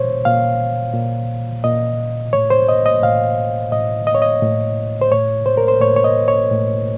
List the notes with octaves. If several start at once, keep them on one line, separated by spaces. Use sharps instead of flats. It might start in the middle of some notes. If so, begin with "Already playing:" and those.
Already playing: A#2 C5 C#5
A#2 F5
A#2
A#2 D#5
A2 C#5
C5
D#5
D#5
A2 F5
A2 D#5
D#5
C#5
D#5
A2
C5
A2 C#5
C5
A#4
C5
A2 C#5
C#5
D#5
C#5
A2